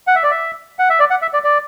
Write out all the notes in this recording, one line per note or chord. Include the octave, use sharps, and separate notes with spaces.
F#5
E5
D5
E5
F#5
E5
D5
F#5
E5
D5
D5